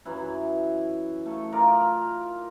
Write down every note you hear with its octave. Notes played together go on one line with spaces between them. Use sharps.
F#2 E3 E4
A3 A4
D#4 F4 A#4 D5